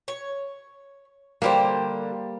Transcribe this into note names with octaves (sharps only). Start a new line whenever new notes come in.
C#5
D3 G3 A#3 G4 C5